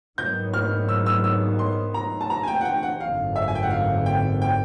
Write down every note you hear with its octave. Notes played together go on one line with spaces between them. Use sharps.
G#2 D#3 F#3 B3 G6
F6
E6
E6
E6
C6
A#5
A5
A#5
G#5
G5
F#5
G5
F#5
G#1 F#2 D3 F5
E5
G#5
G5
F#5
F5
G5
G5